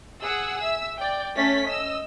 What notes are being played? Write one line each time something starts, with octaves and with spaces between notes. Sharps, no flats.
G#4 F#5 E6
E5 E6
D5 G5
A3 C#4 A5 A6 B6
D#5 E6